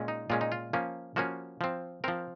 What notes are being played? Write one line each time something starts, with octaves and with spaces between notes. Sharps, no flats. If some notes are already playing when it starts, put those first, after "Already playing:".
Already playing: A#2 G#3 C#4
D#4
A#2 G#3 C#4 F4
D#4
F4
F3 A#3 C#4
F3 A#3 C#4 F#4
F3 C4
F3 C4 A#4